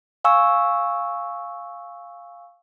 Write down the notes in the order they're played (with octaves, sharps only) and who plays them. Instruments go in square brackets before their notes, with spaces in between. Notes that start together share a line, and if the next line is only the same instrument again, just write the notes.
[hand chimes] F5 G#5 C#6 E6